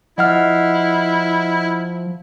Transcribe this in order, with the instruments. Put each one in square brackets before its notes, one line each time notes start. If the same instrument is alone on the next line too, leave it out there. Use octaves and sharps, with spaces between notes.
[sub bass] F3 [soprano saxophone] E4 [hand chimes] D#5 F#5 F6